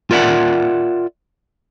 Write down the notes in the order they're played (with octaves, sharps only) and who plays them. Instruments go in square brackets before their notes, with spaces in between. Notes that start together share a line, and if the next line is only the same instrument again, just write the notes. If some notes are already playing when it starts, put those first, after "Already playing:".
[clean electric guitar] F4 A#4 D5 E5 F#5